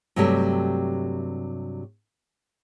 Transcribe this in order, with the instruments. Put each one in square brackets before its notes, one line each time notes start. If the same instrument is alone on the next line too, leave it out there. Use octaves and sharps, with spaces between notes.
[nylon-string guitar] G2 C3 F#3 A3 G4